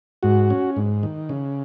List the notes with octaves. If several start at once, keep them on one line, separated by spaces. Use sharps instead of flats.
G#2 F#4
C#4
G#2
D#3
C#3